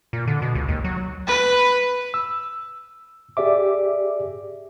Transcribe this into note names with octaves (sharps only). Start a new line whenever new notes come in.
A#2
D3
B2
C#2
D#2
F#3
B4
E6
G4 G#4 D5 E5 D6